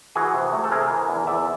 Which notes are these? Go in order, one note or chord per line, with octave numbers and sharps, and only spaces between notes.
E3 F#4 G#4
C3
A3
A4
C3 G#4 A#4
E3
E2
E2 D5 E5